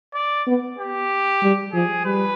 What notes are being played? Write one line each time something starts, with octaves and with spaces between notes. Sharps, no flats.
D5
B3
G4
G3
F3 G#4
G3 B4